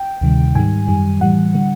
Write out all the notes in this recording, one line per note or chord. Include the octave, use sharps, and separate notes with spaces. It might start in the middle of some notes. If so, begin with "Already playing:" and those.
Already playing: G5
D2 C3 D#3 G3
G#2 D#3 G3 G#5
F#2 D#3 G3
A2 E3 G3 F#5
D3 G3